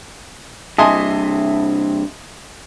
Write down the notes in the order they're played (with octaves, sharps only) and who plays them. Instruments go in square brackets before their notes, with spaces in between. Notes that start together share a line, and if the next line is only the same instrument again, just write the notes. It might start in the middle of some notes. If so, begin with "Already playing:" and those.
[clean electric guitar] G2 C3 [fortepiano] D#5 G#5 C6 [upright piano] E5 A5